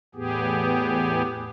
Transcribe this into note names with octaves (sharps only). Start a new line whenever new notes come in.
E2 A2 B3 G4 G#4